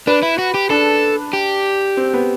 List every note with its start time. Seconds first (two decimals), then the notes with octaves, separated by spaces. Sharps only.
0.07 D4 B4
0.23 E4
0.38 F#4
0.54 G4
0.70 D4 A4
1.33 G4
1.97 C4
2.14 B3